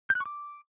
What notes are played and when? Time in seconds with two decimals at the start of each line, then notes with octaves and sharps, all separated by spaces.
0.10 G6
0.15 F#6
0.20 C#6
0.26 D6